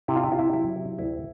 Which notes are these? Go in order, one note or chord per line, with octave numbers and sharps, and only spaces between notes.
C3 E4
F4
E4
C3 F4
E4
F#3 E4
C3
D2 E4